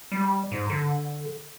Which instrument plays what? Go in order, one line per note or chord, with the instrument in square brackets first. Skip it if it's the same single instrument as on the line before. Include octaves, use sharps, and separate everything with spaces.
[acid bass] G3
G#2
D3